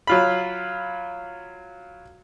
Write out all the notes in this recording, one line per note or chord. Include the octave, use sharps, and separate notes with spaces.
F#3 F4 B5